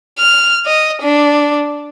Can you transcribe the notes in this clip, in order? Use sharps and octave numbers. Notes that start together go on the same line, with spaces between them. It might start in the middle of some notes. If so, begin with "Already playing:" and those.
F6
D#5
D4